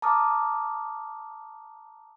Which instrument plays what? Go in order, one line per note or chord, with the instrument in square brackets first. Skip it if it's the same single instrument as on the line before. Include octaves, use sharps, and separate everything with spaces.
[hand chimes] A5 A#5 D6 D#6 F6